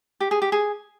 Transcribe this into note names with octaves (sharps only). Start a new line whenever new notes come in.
G4
G#4
G4
G#4